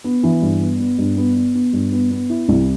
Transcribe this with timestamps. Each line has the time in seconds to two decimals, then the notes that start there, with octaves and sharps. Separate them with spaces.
0.04 B3
0.23 E3
0.42 G2
0.61 B3
0.79 B3
0.98 G2
1.17 B3
1.36 B3
1.55 B3
1.73 G2
1.92 B3
2.11 B3
2.30 E4
2.49 C2